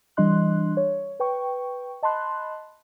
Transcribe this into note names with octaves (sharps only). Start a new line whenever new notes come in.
E3 G3 D4 D#5 C6 F#6
C#5
B4 G5 C#6
D#5 A5 B5 C6 F#6